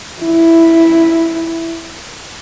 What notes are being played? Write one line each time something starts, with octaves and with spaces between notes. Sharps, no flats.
E4